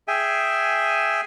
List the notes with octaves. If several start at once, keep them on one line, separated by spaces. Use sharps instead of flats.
G#4 E5 G5 G#5